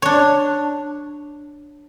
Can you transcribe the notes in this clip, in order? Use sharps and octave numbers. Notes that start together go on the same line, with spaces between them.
D4 C#5